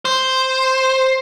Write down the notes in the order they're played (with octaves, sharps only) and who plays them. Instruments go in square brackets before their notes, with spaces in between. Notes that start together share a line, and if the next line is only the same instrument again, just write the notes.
[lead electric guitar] C5